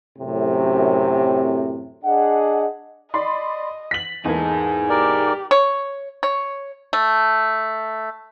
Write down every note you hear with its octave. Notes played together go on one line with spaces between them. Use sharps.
F#2 A2 C3
D4 G#4 D#5 F#5
D5 D#5 B5 C6
B6 F#7
E2 A#3 D#4 G#4 A4
G4 A#4 D5
C#5
C#5
A3